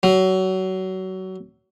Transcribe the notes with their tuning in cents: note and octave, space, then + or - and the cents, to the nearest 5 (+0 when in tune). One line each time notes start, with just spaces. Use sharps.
F#3 +25